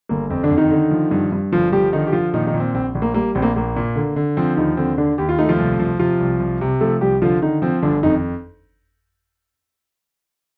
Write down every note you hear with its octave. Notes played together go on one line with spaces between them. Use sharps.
G1 A#3
F2 C4
D3 D4
F2
D#3 D#4
D3
F3
G2
G2
G1 F3 F4
F3 G3 G4
D3 D#3 D#4
G4
F3 F4
A#2 D#3 D#4
D#3 D#4
A#2
C4
A#1 C4
A#1
A#3
G3 A#3
A#1 C4
A#3
A#1 A#3
A#2
D3
D3
F3 C4
D#2 D#3 D#4
D3 C4
D3 D4
D#2 G4
F4
A3 D#4
F3 F4
C2
F3
C3 F3 F4
C2
C2
C3
F3 A3 A4
C2 G3 G4
D3 F3 F4
D3 D#3 D#4
F3 C4
G1 D3 D4
F2 D#3 D#4